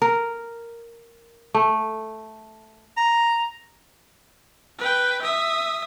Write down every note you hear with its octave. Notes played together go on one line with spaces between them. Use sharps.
A#4
A3
A#5
B4 G5
E5 D#6